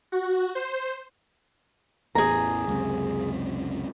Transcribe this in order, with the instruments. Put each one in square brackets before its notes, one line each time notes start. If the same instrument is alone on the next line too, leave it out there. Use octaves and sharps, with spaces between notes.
[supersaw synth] F#4
C5
[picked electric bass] A1 E2 A2 [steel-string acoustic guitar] G#4 A#5
[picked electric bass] C#2 F#2 C3